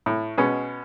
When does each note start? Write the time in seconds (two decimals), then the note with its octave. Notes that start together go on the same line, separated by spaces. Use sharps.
0.06 A2
0.38 B2 G#3 B3 C#4